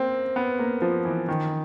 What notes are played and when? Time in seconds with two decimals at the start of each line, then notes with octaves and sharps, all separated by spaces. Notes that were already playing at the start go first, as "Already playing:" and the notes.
Already playing: A#3 C4
0.36 B3
0.59 A#3
0.82 F3
1.05 E3
1.28 D#3